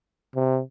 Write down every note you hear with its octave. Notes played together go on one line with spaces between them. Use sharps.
C3